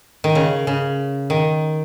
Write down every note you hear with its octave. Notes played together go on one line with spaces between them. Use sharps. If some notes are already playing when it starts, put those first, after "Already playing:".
D#3
C#3
C#3
D#3